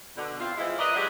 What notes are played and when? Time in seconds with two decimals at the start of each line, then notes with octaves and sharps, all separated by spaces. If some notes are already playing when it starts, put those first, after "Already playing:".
0.17 B2 D3
0.40 C4 E4 F4
0.58 E3 F3 G#3 E4
0.79 A#4 B4 D5 D#5
0.95 F#3 G#3 D4 F#4 G4